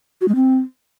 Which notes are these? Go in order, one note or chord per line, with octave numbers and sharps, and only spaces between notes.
F#4
G#3
C4